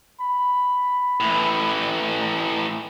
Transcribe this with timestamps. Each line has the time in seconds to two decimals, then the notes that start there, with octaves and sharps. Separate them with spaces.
0.20 B5
1.20 A2 E3